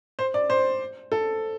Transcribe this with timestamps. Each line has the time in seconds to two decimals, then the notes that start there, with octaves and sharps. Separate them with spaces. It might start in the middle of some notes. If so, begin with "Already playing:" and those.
0.19 C5
0.34 D5
0.50 C5
1.12 A4